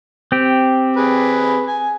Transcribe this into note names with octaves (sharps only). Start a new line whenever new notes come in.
C4 G4
G#4 B4
G#5